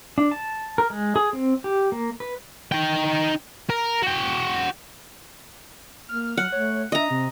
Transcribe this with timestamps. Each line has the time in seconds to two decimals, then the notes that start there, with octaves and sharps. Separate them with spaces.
0.18 D4
0.31 A5
0.78 A#4
0.90 G#3
1.16 G#4
1.33 C4
1.64 G4
1.92 A#3
2.20 B4
2.72 D#4 G5
3.70 A#4
4.02 F#4 G5
6.09 A#3 F6
6.37 F#3 F#5
6.52 A3 C#5
6.92 D4 D#5 E5 A#5
7.10 C3 C4